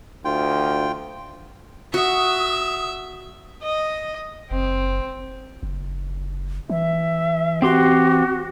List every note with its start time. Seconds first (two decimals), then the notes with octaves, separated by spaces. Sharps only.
0.25 D2 F4 G5
1.94 F#4 E5 D#6
3.63 D#5
4.51 F#1 C4
5.63 F#1
6.70 E3 E5
7.62 C4 F#4 G4 C6